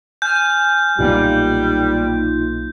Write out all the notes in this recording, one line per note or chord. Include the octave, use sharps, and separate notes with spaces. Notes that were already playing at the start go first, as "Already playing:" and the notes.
G#5 F6 G6
B1 A#2 G3 A#3 B3 D#4 F4